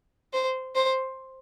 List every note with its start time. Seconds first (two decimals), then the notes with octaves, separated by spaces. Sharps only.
0.33 C5
0.75 C5